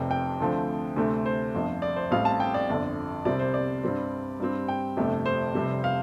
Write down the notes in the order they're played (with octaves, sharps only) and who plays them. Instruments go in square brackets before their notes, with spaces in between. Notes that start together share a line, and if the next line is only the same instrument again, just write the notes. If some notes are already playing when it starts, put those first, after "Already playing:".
Already playing: [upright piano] F1 F2 C3 G5
G5
D2 D3 F3 A3 C4
D2 C3 A3 C4
C5
G1 F2 F3
D5
C5
A1 A2 G3 C4 F5
A5
G5
D5
G1 F2 D3
C2 C3 G3 C4 D5
C5
D5
G2 G3 C4
G2 G3 C4
G5
G1 F2 C3 A3
C5
F1 F2 C3 G3 C4
F5